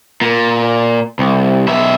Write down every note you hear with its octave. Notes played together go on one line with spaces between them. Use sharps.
A#2
C2
B1 E5